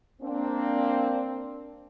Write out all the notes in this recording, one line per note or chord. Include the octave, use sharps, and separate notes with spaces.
A#3 C4 D4